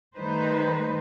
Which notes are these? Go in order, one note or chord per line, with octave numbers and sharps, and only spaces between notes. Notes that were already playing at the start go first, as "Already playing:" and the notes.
D#3 G3 A3 D#4 B4 C5